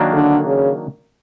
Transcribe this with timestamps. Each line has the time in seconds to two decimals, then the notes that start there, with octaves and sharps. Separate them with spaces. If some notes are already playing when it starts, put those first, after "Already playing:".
Already playing: D#3 F#3 A#3 D4
0.14 D3
0.46 C#3